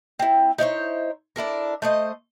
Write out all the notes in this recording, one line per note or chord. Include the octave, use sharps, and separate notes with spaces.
C4 E4
D#4 E4 C5 C#5
D4 E4 A4 A#4
A3 C5 D#5